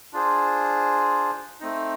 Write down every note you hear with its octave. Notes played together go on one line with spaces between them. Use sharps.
D4 F4 G#4 C5
A3 C4 D#4